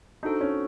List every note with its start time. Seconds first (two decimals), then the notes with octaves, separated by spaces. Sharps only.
0.23 D4 D#4 F#4 A4 C5
0.41 C#4